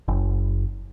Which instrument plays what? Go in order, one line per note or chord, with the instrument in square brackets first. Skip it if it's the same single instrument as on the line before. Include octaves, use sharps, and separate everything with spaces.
[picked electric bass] F#1